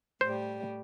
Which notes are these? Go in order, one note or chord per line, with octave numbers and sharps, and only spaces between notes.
A2 G3 C5